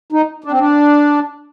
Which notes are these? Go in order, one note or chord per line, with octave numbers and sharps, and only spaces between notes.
D#4
D4
C4
D4